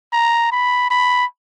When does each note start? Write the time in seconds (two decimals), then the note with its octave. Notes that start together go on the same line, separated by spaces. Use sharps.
0.12 A#5
0.52 B5
0.90 B5